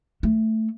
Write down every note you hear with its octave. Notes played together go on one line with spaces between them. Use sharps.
A3